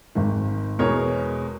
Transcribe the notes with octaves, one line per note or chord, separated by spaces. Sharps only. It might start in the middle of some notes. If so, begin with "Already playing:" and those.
G#1 G#2 D#3
E2 B2 G#3 A#4 C#5